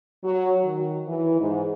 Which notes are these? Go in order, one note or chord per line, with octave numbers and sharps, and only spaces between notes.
F#3
D#3
E3
G#2